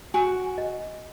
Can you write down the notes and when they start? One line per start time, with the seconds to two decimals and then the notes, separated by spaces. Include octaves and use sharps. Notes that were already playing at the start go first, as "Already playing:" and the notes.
0.14 F#4 G#5
0.58 D#5